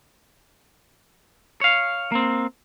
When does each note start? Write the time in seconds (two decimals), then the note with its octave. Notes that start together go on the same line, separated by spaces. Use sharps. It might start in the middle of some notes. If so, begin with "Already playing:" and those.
1.61 C#5 F5
2.12 A#3 C4